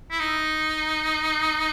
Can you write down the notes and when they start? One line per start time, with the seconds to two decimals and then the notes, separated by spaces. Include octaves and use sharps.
0.11 E4
0.20 D#4